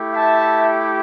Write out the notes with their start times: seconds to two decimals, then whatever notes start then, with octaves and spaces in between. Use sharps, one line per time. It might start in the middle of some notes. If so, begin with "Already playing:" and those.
Already playing: A3 E4 G4
0.14 E5 A5